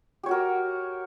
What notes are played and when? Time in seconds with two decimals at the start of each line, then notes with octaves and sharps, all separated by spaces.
0.23 G4
0.26 C#5
0.29 F#4
0.31 A#4